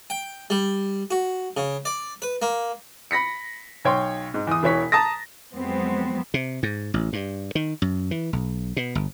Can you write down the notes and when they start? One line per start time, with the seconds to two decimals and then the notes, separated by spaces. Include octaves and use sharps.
0.10 G5
0.50 G3
1.11 F#4
1.57 C#3
1.85 D5
2.22 B4
2.42 A#3
3.11 B5 A#6 B6 C#7
3.85 B1 C#5 G5 C6
4.34 G#2
4.47 E2 D#6
4.63 E1 E3 C#5 B6
4.92 A5 A#5 D#6 A6 A#6
5.54 F2 F#3 G#3 B3 C4
6.34 C3
6.63 G#2
6.94 A1
7.13 G2
7.55 D#3
7.82 F#2
8.11 E3
8.33 B1
8.76 B2
8.95 G1